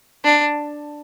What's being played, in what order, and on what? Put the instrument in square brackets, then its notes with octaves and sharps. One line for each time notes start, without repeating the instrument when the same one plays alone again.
[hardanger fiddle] D4